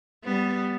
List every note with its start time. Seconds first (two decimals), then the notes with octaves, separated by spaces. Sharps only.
0.24 G3 B3